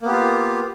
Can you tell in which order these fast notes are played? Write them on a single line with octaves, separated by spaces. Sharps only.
A#3 B3 G4 F4